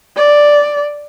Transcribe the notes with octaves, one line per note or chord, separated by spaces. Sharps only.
D5